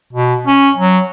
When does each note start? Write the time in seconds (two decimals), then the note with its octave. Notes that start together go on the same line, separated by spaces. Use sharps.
0.13 B2
0.47 C#4
0.77 F#3